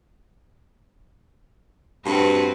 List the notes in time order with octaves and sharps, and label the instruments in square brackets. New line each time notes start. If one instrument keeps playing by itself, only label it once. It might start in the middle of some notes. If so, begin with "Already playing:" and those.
[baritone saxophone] G2 [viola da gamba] C4 F#4 B4